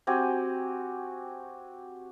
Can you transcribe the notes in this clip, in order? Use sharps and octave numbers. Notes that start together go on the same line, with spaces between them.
C4 F#4 G4 G#5